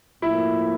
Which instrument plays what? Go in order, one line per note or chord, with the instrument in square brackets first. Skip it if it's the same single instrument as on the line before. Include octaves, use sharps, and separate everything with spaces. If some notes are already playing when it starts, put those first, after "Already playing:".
[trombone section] A2 F3 A#3 [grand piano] E4